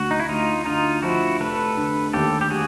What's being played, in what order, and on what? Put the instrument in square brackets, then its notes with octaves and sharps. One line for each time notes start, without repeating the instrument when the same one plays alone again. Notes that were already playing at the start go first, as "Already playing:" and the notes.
Already playing: [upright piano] D2 [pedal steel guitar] F#4
[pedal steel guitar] D#4
E4
[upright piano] D2 [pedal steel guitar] D#4 F4
[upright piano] D3 [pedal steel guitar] D#4 F4
[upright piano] F3 [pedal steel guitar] E4 F#4
[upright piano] F1 [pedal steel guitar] A4 B4
[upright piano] D3
[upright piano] D#2 [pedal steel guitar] G4 A4
[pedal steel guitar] G4
[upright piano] G3 [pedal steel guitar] F#4 G#4